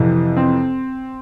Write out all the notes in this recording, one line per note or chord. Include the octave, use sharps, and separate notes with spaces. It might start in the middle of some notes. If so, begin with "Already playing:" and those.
Already playing: F2 C3 E3
C4